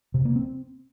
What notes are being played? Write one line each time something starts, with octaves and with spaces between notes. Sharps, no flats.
C3
A#3
C4